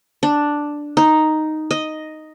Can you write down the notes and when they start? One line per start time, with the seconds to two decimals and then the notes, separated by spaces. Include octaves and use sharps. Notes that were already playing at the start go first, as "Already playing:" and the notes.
0.23 D4
0.97 D#4
1.71 D#5